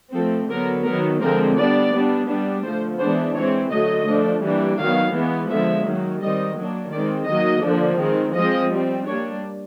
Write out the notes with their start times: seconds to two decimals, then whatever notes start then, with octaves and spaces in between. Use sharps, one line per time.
0.14 F3 A3 C4 A4
0.49 D3 F#3 B3 A#4
0.85 D#3 F#3 B3 A#4
1.21 D3 F3 G#3 C4 A#4
1.57 G3 B3 D4 D5
1.92 G3 B3 D4
2.28 G3 B3 D4
2.64 D3 F3 A3 C5
2.99 E3 G#3 B3 D4 C5
3.35 E3 G#3 C4 C#5
3.71 D3 F#3 A3 D#5
4.07 F3 A3 D4
4.43 E3 G3 A#3 D4
4.78 D#3 F#3 B3 F5
5.14 E3 G#3 B3
5.49 D3 F3 G#3 B3 E5
5.85 D#3 F#3 A#3
6.21 D#3 G3 C4 D#5
6.56 F#3 A#3 D4
6.92 D#3 G#3 C4 D5
7.28 D#3 F#3 A#3 D#5
7.63 D3 F3 A#3 D4
7.99 D#3 G#3 C4
8.35 F3 G#3 C4 D#5
8.70 G3 C4
9.06 G3 A#3 D4 C#5